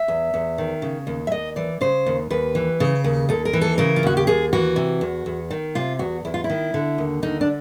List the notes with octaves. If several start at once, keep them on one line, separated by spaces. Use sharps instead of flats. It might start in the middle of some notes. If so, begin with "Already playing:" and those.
Already playing: E5
E2
E2
D#3
C#3
D#2
E5
D#2 D#5
E3 D5
C#3 C5
D#2
D#2 B4
E3
C#3
D#2
D#2 A4
A#4
E3
A4
C#3 A#4
F4
D#2 F#4
G4
D#2 G#4
E3 F#4
C3
E2
E2
D#3
C3 F4
E2 F#4
E2 E4
F4
E4
D#3
D3
D#2
D3 D#4
D4